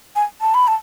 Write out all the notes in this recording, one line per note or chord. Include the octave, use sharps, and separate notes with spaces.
G#5
A5
B5
A5